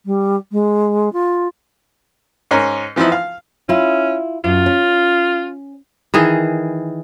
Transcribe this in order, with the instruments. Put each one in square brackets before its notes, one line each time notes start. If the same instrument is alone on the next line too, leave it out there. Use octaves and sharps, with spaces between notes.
[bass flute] G3
G#3
F4
[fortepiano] G#2 C#4 A#4
E3 F3 B3 D#4 E4
F5
[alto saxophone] C#4 [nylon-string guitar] E4 F4
[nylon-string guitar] F#2 [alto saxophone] F4
[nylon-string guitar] C#4
[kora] D#3 E3 G#4